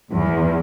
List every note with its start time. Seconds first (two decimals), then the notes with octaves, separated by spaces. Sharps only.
0.12 E2